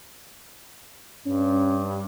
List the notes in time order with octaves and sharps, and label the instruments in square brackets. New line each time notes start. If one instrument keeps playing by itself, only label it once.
[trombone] G2 [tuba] C#4